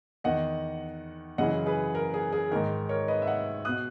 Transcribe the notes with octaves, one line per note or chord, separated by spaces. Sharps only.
E2 D#3 D#5 F#5
F#2 C#3 E3 D#5 F#5
G#4 B4
A#4
G#4
G#4
G#2 D#3 A#4
A#4 C#5
B4 D#5
E5
D#5 F#5
B2 D#6 F#6